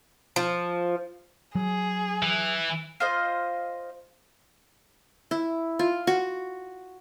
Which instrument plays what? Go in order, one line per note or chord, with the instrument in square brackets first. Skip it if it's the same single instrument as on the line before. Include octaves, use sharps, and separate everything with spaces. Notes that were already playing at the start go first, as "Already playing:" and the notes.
[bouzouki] F3
[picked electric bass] F#3 [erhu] G#4
[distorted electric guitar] E3
[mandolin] F4 C5 D#5
[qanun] E4
F4
F#4